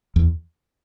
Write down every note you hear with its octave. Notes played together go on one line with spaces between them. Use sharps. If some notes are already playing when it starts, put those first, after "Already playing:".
E2